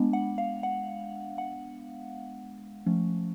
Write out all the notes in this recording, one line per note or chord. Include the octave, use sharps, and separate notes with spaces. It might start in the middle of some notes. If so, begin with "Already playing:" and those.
Already playing: G#3 B3 D4
F#5
F5
F#5
F#5
F3 A3 C#4